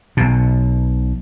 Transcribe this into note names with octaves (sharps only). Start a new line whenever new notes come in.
B1 B2